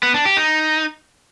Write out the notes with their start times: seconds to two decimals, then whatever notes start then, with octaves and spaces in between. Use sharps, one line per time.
0.03 B3
0.14 D4
0.26 G4
0.37 D#4